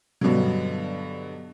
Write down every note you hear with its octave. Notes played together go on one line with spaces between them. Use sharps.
G2 B2 D3 F#3